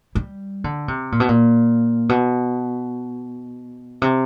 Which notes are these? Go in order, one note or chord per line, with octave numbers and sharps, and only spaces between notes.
G3
D3
C3
A#2
B2
A#2
B2
C3